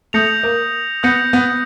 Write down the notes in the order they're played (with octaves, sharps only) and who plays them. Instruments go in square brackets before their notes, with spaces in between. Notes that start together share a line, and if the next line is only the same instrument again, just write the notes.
[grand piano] A3 [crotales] D#6 G6 A#6 C#7 F7
[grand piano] A#3
[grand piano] B3 [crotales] D#6 G6 A#6 C#7 F7
[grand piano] B3